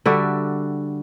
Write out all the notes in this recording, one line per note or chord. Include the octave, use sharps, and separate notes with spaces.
D3 G3 F#4 E5